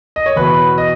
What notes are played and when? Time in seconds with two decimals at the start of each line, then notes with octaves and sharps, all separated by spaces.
0.16 D#5
0.26 C#5
0.36 E2 B2 B4
0.78 D#5